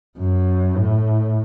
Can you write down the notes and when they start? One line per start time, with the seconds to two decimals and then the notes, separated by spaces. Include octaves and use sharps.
0.19 F#2
0.76 A2